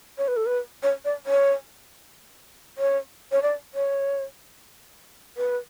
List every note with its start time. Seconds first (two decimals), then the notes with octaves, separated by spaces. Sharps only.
0.18 C#5
0.28 B4
0.36 A4
0.46 B4
0.83 C#5
1.05 D5
1.26 C#5
2.78 C#5
3.32 C#5
3.42 D5
3.74 C#5
5.37 B4